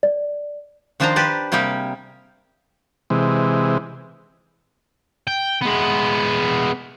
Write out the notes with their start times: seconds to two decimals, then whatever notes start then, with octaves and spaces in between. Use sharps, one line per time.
0.03 D5
1.00 D#3 F3 D4 C5 D#5 A#5
1.16 G4 B4 D5 A5
1.52 C3 G3 A#3 G4 G#4
3.10 C3 E3 G#3
5.28 G5
5.62 G#3 B3